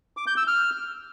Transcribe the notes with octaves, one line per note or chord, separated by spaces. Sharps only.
D6
G6
E6
F6